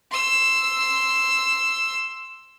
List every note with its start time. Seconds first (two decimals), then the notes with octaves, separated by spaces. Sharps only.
0.11 C6 E6